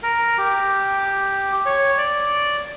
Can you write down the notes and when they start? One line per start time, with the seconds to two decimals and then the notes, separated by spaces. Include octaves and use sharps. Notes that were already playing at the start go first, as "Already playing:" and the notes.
0.03 A#4
0.38 G4
1.66 C#5
1.98 D5